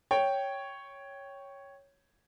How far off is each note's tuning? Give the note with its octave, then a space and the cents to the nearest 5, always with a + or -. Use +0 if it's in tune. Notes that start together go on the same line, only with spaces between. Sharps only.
C#5 +0 G5 -5